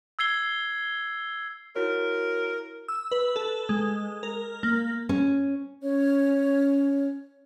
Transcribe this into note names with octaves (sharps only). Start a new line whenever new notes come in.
E6 G#6 C7 G7
E4 F#4 A#4 C#5
E6
B4
A4
G#3
A#4
A#3
C#4
C#4 C#5